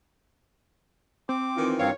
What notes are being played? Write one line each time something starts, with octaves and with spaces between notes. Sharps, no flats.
C4 D6
D#3 E3 F4
G2 C4 C#5 F5